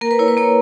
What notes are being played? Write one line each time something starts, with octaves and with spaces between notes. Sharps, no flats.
A#3 A#4
B4
E4 C#5
B4
A#3 C#5